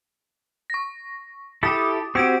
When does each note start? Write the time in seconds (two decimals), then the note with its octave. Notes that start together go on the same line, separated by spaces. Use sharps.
0.70 C#6 A#6
1.63 E4 G4 A4 D6 D#6 A6
2.15 C4 F#4 G4 E6 G#6 D7